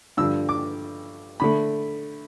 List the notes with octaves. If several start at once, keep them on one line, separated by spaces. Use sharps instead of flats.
G2 D3 F3 E6
D6
D3 A3 B5